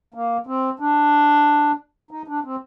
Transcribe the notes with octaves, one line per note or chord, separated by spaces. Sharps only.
A#3
C4
D4
D#4
D4
C4